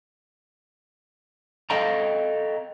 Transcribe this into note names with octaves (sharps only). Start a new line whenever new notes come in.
A4 D#5 F5 G5 A#5